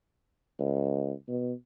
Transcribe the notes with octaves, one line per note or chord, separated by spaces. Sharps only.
C#2
B2